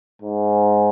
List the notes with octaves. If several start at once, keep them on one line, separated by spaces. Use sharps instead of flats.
G#2